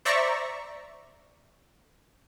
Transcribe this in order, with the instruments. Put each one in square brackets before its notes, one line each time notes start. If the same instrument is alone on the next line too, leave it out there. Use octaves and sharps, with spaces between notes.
[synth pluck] C5 D5 E5 A#5 C#6